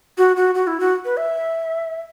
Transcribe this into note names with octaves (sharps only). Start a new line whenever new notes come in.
F#4
F#4
F#4
E4
F#4
B4
E5